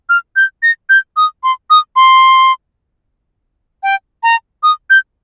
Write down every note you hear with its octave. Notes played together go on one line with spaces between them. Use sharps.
F6
G6
A#6
G6
D#6
C6
D#6
C6
G5
A#5
D#6
G6